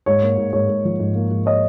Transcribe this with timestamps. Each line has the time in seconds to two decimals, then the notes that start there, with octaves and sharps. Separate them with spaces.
0.06 G#2 C#5
0.22 A#3
0.38 G#2
0.53 G#2 C#5
0.69 G#2
0.85 F3
1.00 G#2
1.15 A#3
1.31 G#2
1.46 C#5 D#5